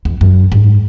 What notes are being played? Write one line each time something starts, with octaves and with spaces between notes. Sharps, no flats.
E2
F#2
G#2